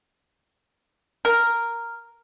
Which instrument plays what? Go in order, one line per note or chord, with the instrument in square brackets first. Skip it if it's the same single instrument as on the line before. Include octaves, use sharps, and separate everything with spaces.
[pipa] A#4